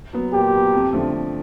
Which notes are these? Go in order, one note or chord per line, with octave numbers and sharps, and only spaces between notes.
F#3 B3
A#2 G4
F#3 B3
F2
D3 F3 A3
F2